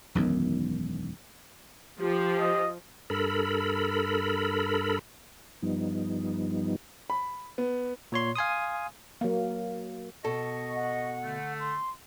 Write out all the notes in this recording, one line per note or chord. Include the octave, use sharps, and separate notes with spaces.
E1 B1 F#2 D#3
F3 G4
D#5
G2 A4 A#4 B5
G2 F3 G3 B3 D#4
B5
B3
A#2 C#5 C6
F5 G#5 C6 D#6
F#3 A#3
B2 A4 D#5 C#6
F#5
D3 A3
C6